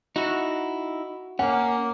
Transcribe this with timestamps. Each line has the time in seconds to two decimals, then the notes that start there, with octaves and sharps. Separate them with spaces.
0.16 D#4 E4 F#4
1.39 A#3 C#4 F#5